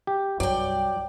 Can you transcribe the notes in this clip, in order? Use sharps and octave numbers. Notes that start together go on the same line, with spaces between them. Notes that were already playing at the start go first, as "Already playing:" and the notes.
G4
C2 G2 F#3 D5 G5